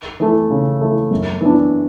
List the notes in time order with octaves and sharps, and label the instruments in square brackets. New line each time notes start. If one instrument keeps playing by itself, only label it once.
[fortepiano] E3 A3
C#3
E3 A3
F#2
E3 B3 D4